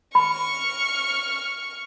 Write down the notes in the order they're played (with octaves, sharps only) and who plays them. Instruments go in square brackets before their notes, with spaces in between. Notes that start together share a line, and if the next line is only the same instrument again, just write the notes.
[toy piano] B5 [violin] C#6 F6